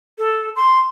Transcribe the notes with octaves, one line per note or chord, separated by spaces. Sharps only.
A4
C6